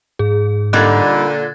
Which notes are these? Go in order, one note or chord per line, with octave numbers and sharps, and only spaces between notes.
G#2 G#4
A#2 D3 G3 A#3 D#4 F#6 G#6 A6